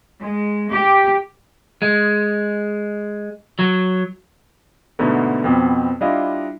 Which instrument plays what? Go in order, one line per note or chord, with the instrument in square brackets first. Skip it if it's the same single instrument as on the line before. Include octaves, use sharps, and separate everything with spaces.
[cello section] G#3
G4
[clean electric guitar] G#3
F#3
[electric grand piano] G#2 B2 D3 A3 B3
F2 B2 B3 C4
G3 D4 E4 F4 D#5 F5